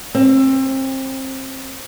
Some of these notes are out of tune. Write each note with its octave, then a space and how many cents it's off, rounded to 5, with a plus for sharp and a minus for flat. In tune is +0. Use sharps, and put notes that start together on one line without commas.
C4 +30